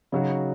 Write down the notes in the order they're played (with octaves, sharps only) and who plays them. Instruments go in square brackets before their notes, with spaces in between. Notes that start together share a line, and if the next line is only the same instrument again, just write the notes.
[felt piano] C#3 F#3 D#4 F#4